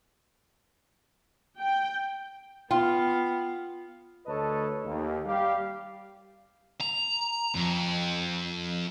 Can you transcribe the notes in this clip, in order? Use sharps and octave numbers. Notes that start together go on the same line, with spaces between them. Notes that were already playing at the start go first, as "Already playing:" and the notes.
G5
B3 F4 F5 G5
D2 A4 B4 C#5 D#5 A5
D#2
G3 G4 F5
A#5
F2